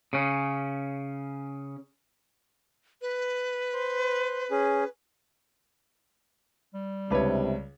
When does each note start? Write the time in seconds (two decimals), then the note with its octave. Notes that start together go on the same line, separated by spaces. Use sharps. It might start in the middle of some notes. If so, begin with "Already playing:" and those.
0.13 C#3 C#4
3.02 B4
3.73 C5
4.50 C#4 G#4
6.74 G3
7.10 C#2 C3 D4 E4 B4 C#5